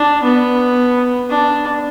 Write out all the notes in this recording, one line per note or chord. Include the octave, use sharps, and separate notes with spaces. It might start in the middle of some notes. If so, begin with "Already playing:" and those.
Already playing: D4
B3
D4